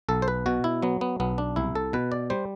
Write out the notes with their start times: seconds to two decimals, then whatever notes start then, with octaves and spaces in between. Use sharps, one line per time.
0.09 B1 A4
0.22 C5
0.28 B4
0.46 B2 F#4
0.64 E4
0.82 F#3 B3
1.01 B3
1.20 B1 B3
1.38 D4
1.56 C2 E4
1.75 A4
1.93 B2 B4
2.12 D5
2.30 G3 C5